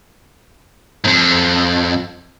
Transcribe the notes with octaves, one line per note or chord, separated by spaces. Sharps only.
F2 G#2